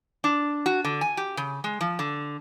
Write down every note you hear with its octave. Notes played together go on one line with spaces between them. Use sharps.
D4
F#4
D3
G#5
G4
C#3
G#3
F3
D3